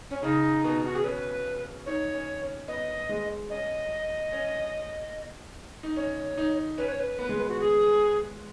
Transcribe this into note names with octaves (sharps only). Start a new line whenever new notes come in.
C#4
C#3 D#4
B2
F#4
G#4
C#4 B4
D#4 C#5
C#4
C#4
B3 D#5
G#3
C#4 D#5
C#4
D#4
C#4 C#5
D#4
C#4 B4
C#5
B4
B3
G#3
B3
F#4
G#4